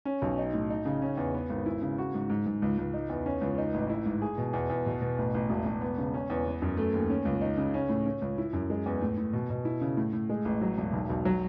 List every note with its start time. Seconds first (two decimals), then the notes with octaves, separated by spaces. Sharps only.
0.05 C#4
0.22 B1
0.38 D#4
0.54 A2
0.70 D#4
0.85 C#3
1.02 C#4
1.17 E2
1.34 B3
1.50 G#1
1.66 E4
1.82 C#3
1.98 F#4
2.14 G#2
2.30 G#2
2.46 G#2
2.62 C#2
2.78 C#2
2.94 D#4
3.09 E2
3.26 C#4
3.41 C#2
3.58 D#4
3.74 A1
3.89 E4
4.06 G#2
4.22 G#4
4.38 B2
4.53 E2
4.70 E2
4.86 B2
5.02 B2
5.18 A1
5.34 A1
5.50 E1
5.66 E1
5.81 B3
5.98 C#3
6.14 C#4
6.30 E2
6.46 B3
6.62 F#2
6.77 A3
6.94 D#2
7.09 C#4
7.25 C#2
7.41 D#4
7.57 C#3
7.74 C#4
7.89 A2
8.06 C#4
8.22 C#2
8.38 E4
8.53 F#2
8.70 G#3
8.86 E2
9.01 A2
9.17 A2
9.33 B2
9.50 B2
9.65 E4
9.81 C#3
9.97 A2
10.13 A2
10.29 G#3
10.45 A1
10.61 F#3
10.78 E1
10.93 B1
11.10 B1
11.25 F#3